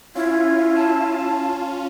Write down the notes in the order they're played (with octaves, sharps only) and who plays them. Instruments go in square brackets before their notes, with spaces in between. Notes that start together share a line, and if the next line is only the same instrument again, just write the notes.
[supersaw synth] C#4 F4 [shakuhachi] E4
[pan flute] A5